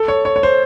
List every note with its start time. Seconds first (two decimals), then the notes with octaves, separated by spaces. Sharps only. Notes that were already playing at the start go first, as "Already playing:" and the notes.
Already playing: A4
0.08 C#5
0.25 C#5
0.36 C#5
0.43 C5